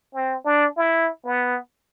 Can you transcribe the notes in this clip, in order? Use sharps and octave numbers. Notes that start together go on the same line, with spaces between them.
C4
D4
E4
B3